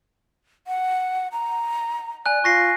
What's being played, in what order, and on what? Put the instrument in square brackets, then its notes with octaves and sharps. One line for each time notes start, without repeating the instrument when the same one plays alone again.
[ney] F#5
A#5
[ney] D5 [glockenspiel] G#5 F#6
[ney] F4 [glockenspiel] C#6 A#6 C7